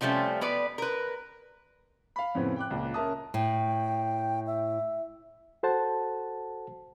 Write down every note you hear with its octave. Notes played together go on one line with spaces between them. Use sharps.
C3 F3 G3 A3 C#4
B3 B4 D5
A#4 B4
F5 B5
F2 A2 C#3 B3 C4
G5 D6 F#6
C#2 A#2
C#4 A#4 E5 A5 D#6
A2 G5
E5
F#4 A4 C5 F#5 A5